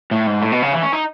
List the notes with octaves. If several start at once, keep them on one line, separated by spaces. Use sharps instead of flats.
A2
G#2
A2
B2
C#3
E3
C#4
D#4